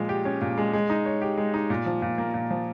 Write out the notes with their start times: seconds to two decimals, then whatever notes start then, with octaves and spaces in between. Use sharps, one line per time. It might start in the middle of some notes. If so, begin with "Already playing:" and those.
Already playing: A#2 F3 G#3
0.09 G4
0.25 C#4
0.41 A#2
0.57 G#3
0.73 G#3
0.89 D#4
1.06 C#5
1.22 G4
1.37 G#3
1.54 D#4
1.70 A#2
1.86 F3
2.02 A#2
2.18 A#3
2.34 A#2
2.51 F3